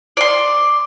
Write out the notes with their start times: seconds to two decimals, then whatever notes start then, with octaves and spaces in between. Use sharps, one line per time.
0.17 D5 C6